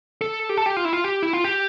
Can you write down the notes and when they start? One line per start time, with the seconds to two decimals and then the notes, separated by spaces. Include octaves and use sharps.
0.21 A4
0.49 G4
0.57 A4
0.66 G4
0.77 F4
0.85 E4
0.93 F4
1.04 G4
1.22 E4
1.33 F4
1.44 G4